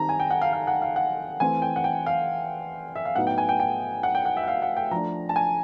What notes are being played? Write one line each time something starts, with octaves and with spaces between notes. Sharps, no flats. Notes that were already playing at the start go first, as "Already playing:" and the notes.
Already playing: D#3 G3 C4 D#4 A5 A#5
G#5
G5
F#5
F5
F5
F#5
F5
F#5
E3 A3 C4 G#5
G5
F#5
G5
F5
E5
F5
A2 F#3 B3 D#4 F#5
G5
G#5
G5
G5
F#5
G5
F#5
E5
F#5
F5
F#5
G5
F3 A3 D4 A#5
A5
G#5